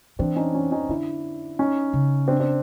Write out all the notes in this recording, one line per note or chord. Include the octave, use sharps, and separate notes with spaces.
E3 C4 D4
C#4 D#4
C#4 D#4
C#4 D#4
D3 D4 E4
C#4 D#4
C#3
C4 D4
C4 D4